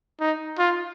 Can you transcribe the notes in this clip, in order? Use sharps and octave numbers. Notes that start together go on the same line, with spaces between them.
D#4
F4